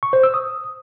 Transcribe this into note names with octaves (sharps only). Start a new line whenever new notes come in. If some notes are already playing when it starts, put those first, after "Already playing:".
C#6
C5
E6
D#6